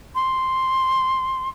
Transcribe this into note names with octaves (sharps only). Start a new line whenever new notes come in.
C6